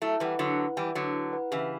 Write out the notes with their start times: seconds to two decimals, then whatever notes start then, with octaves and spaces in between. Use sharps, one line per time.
0.02 F#3 A3 E4
0.20 E3 G3 B4 F#5
0.39 D3 F#3 E4
0.58 B4 F#5
0.76 E3 G3 E4
0.95 D3 F#3 B4 F#5
1.14 E4
1.33 B4 F#5
1.51 C#3 E3 G4